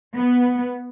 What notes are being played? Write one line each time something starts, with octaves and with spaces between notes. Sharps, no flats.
B3